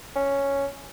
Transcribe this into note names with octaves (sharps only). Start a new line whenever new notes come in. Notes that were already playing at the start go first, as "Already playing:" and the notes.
C#4